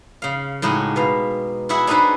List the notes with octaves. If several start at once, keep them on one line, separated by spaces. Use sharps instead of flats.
C#3 F5
A2 C#3 G#3 D#4 F#4 G4
B2 F5
E4 F#4 G#4 E5 F#5
D4 D#4 G#4 A4 B4 C5